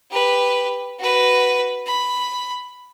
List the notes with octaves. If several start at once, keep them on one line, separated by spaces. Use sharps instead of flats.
G4 B4
F#4 B4
B5